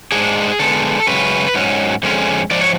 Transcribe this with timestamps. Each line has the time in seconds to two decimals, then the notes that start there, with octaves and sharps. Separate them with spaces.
0.12 G#2 F3 G#3 D4 G#4
0.59 D3 G#3 B3 A4
1.07 F#2 C#3 G#3 C#4 B4
1.55 G#2 F#3 C#4
2.03 F2 D3 G#3 C#4
2.51 G#2 F3 D5
2.61 C#5